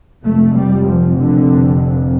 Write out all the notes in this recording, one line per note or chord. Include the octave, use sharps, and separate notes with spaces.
F1 F2 C3 A3
G3
F3
D3